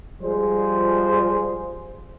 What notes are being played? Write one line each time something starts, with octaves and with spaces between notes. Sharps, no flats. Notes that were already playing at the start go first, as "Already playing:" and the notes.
F3 G3 G#3 G#4 C5